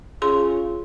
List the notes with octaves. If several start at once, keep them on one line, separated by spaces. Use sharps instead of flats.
C#4 F4 G#4 C6